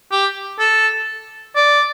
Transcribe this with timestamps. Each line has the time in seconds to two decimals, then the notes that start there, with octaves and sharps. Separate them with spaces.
0.12 G4
0.59 A4
1.56 D5